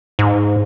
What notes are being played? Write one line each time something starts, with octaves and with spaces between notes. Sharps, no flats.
G#2